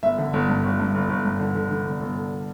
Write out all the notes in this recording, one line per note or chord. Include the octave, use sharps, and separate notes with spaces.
G1 E5
D3
G1
G2
G1
G2
G1
G1
G2
D3
D3
D3
G1
G1
D3